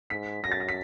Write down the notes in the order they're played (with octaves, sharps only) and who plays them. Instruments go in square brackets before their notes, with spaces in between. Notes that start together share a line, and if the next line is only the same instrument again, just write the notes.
[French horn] G#2 [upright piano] B6
[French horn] F#2 [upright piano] A#6
[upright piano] A6
A#6
B6